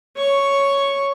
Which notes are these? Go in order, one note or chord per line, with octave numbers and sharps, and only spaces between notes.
C#5 C#6